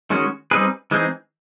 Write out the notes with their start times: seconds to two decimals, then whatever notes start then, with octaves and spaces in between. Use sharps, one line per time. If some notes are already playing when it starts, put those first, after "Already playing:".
0.10 D#3 G#3 C#4 F#4
0.51 G3 C4 D#4 G#4 B4
0.91 E3 G#3 C4 D#4 G#4